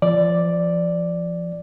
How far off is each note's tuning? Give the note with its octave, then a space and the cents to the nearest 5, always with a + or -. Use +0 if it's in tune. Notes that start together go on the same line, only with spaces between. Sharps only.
F3 -25 D5 +0